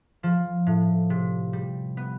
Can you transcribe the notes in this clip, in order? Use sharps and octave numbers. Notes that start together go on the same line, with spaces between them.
F3
A2
C3
G3
B3